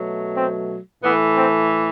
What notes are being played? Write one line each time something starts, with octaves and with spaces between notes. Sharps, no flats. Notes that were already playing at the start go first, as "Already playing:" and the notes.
Already playing: B2 F#3 A3
C4
A2 E3 A3 B3
C4